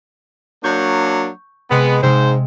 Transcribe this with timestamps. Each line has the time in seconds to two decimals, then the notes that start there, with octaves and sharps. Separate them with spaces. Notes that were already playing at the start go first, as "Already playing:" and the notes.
0.64 F#3 A#3 D4 C#6 G6
1.71 C3 G#3 B3
2.03 G#2 C3 G#3 C5